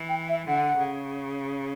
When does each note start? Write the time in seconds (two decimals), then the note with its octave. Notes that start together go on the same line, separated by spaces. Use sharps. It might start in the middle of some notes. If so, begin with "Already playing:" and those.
Already playing: E3
0.09 G5
0.29 E5
0.48 D3 F#5
0.77 C#3